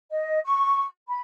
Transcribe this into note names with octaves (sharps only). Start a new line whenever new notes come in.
D#5
C#6
B5